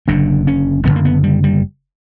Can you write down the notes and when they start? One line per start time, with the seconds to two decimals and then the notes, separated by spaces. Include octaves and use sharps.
0.08 F#1 F#2 D3 D4
0.47 C#4
0.85 F#1 F#2 D3 B3
0.96 A#3
1.05 B3
1.24 G3
1.44 G3